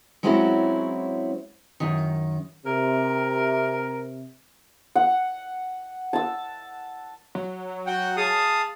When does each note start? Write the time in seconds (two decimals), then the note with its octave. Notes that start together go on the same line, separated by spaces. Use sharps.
0.23 F#3 G#3 C4 C#4 E4 F#4
1.80 F#2 D#3
2.66 C3 A#4
4.96 F#5
6.13 A5 E6
7.35 F#3
7.87 F#4 F#5 G5
8.17 G#4 F5 A5 D#6